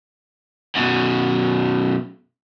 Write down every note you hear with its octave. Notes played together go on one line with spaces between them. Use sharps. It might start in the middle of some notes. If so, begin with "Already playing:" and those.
F#2 B2